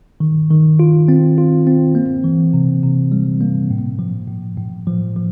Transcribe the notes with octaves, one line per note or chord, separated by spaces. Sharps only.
D#3
D#3
F4
C4
F4
C4
A#3
E3
C3
C3
G3
A#3
A2
F3
A2
A2
F3
F3